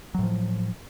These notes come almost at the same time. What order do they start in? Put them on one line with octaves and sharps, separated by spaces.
F#3 A2 F3